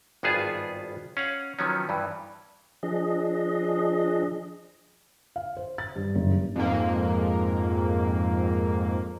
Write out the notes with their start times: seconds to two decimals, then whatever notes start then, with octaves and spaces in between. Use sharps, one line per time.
0.23 G#1 G2 B3 F4 G#4 A5
1.17 C#4 F5 F#5
1.59 D#3 F3 F#3 B3 C#4
1.89 G2 E3
2.83 F3 D4 G#4 D#5
5.36 F5
5.57 C5
5.78 A6
5.96 G2
6.15 F#1
6.32 G2
6.56 F2 G#2 A#3